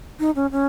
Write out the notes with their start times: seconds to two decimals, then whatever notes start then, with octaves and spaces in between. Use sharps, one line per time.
0.19 D#4
0.35 C#4
0.52 C#4